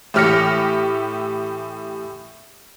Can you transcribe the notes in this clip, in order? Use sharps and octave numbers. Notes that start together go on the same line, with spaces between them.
A2 E3 G4 F6 A#6 C#7